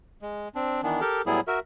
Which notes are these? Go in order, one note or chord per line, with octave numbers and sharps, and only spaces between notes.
G#3
C4 D4
D#3 E3 B3 D4
G4 A4 A#4
A2 F#3 G3 B3 E4 G#4
F#4 A#4 E5